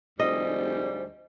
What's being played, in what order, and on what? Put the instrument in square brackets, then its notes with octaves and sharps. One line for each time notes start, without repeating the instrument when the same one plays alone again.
[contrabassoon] F1 [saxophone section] D2 G#2 G3 [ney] C5 [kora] D#5